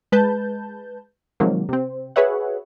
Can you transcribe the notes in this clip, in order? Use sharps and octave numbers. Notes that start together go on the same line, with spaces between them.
G#3 B4 A5 G6
C3 D#3 F3 F#3 G#3 A#3
C3 C4
F#4 G#4 B4 C#5 E5 F#5